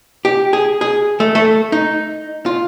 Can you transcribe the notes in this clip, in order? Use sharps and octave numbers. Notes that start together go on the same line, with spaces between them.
G4
G#4
G#4
A3
A3
D#4
F4